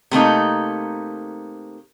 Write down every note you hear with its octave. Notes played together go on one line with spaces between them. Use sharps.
C3 A3 A#3 D#4